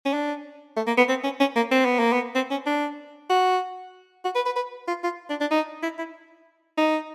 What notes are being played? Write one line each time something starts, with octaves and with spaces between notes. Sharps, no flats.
C#4
D4
A3
A#3
B3
C4
C#4
C#4
A#3
C4
B3
A#3
B3
C4
C#4
D4
F#4
F#4
B4
B4
B4
F4
F4
D4
D4
D#4
E4
E4
D#4